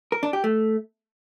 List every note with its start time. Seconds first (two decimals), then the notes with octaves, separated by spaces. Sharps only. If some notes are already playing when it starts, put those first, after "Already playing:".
0.12 A#4
0.23 D4
0.33 G4
0.44 A3